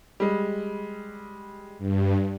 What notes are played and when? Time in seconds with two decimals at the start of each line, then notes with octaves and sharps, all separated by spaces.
0.20 G3 G#3
1.78 G2